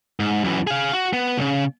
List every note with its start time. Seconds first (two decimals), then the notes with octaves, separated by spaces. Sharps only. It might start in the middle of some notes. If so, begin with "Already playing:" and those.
0.20 G#2
0.44 F#2 E3
0.67 G#4 F5
0.93 F#4
1.13 B3
1.38 C2 C#3